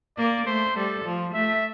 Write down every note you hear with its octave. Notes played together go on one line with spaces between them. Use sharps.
A#3 D5
A3 C5
G3 A4
F3
A3 E5